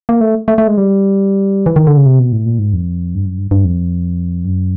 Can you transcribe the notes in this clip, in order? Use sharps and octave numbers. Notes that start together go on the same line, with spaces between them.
A#3
A3
A3
A3
G#3
G3
E3
D#3
D3
C#3
C3
B2
A2
A#2
G#2
F2
G2
F#2
G2
G2
F2
F#2